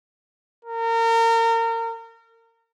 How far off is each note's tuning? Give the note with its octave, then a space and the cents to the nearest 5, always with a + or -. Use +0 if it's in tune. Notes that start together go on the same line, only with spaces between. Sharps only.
A#4 -30